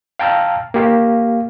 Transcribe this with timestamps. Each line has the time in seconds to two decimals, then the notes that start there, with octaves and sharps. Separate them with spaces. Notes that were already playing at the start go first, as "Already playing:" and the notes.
0.19 F5 G5 A5 A#5 E6 F6
0.74 A#3 G4 F5